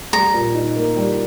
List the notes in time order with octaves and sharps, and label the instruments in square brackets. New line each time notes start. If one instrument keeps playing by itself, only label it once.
[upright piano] G3 [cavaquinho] A#5
[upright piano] A#2
D#4
A#3
G3